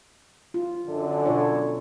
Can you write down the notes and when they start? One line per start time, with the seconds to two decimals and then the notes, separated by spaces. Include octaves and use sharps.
0.54 F4
0.87 F#2 D3
1.25 B2 F4 C#5